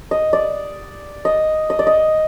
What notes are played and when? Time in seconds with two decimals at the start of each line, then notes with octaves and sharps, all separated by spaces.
0.11 D#5
0.33 D5
1.25 D#5
1.70 D#5
1.79 D5
1.87 D#5